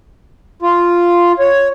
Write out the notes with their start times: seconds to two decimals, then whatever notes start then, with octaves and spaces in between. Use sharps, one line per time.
0.62 F4
1.39 C#5